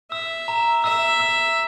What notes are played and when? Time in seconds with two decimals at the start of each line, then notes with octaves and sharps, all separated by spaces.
0.12 E5 E6
0.48 A#5
0.84 E5 E6
1.20 E6